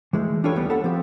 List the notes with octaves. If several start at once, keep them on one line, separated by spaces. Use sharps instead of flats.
E3 G#3 A3
D4 F4 G4 A4 B4 C#5
D#2 E3 G3 B3
A4 B4 C#5 F#5
F3 C4 G4